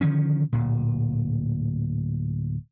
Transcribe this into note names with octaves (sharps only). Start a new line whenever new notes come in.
D3 D#3 F3 C#4
D1 A#2